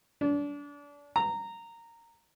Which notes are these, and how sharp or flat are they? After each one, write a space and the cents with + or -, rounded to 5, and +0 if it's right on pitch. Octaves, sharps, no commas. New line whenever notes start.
D4 -30
A#5 -15